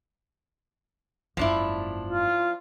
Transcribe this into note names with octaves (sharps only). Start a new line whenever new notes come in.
F#1 G#2 F3 D4 E4
F4